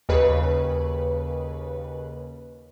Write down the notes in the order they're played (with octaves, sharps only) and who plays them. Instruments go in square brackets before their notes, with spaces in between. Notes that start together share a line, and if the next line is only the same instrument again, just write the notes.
[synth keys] D#2 C#3 B4